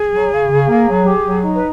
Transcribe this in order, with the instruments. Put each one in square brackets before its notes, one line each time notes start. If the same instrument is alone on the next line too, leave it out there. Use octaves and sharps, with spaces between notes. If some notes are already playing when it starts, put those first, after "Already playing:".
Already playing: [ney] G#4
[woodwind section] F#3
C#3
C#3
A#3
F#3
G4
F#3
D#4
[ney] B4